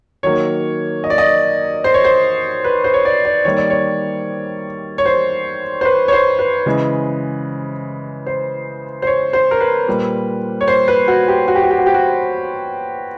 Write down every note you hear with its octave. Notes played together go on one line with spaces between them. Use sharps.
D#3 F#3 A#3 C#5
D#5
D5
D#5
C5
C#5
C5
B4
C5
C#5
D5
D5
D#3 G3 A#3 C#5
D5
C#5
C#5
C5
C5
B4
C#5
C5
B4
C#3 E3 G#3
C5
C5
C#5
C5
A#4
B4
A#2 G3 A#3
C#5
C5
B4
F#4
G4
F#4
G4
F#4
G4
F#4
G4
F#4